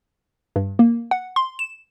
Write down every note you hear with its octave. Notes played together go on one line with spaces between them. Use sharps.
G2
A#3
F#5
C6
E7